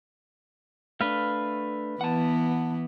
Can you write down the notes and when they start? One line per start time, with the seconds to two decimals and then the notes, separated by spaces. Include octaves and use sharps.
1.01 A3 D4 B4 F5
2.01 E3 B3 F#5 A5